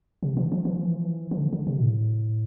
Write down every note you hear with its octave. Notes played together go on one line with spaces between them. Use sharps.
C3
E3
F3
E3
F3
E3
F3
E3
E3
D3
D3
C3
B2
A2